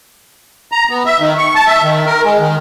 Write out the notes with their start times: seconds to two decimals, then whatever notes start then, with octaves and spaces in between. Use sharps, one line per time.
0.72 A#5
0.90 B3
1.06 E5
1.20 D#3
1.38 C#6
1.55 A5
1.67 E5
1.82 D#3
2.06 A#4
2.24 G#3
2.40 D#3